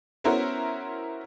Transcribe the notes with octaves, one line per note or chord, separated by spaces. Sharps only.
B3 C#4 E4 F#4 A#4 C5